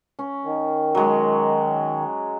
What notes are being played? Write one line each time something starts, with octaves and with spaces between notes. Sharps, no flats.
C#4
D#3
F#3 G#3